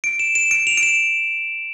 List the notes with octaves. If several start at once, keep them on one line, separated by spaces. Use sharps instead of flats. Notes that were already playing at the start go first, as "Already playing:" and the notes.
D7
E7
E7
D7
F7
D7
E7